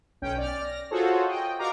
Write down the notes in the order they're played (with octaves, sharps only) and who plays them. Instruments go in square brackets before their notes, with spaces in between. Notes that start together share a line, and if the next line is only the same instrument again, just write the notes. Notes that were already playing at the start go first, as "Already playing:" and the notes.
[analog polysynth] B1 C#4 G5
D5 F6
A#6
F4 F#4 G#4 A4 C5 C#5
D#5 G5
F#4 A#4 D5 F5 A#5 D6